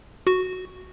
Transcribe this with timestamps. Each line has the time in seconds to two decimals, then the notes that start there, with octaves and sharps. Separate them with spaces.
0.27 F#4